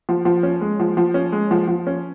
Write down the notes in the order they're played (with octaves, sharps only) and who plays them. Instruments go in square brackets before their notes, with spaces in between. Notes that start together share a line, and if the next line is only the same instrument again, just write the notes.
[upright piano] F3
F3
C#4
G#3
F3
F3
C#4
G#3
F3
F3
C#4